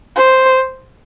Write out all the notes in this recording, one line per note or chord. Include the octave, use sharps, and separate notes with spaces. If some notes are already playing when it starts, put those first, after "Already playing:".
C5